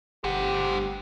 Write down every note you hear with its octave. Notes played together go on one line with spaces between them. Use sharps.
G1 G4 C5 F#5